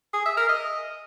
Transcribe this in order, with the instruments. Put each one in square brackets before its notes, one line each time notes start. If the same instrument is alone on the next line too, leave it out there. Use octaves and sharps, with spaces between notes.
[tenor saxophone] G#4
E5
A#4
D#5